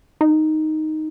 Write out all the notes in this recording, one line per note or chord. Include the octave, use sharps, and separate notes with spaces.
D#4